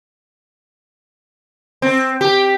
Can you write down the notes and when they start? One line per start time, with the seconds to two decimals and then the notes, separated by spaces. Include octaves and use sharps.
1.82 C4
2.21 G4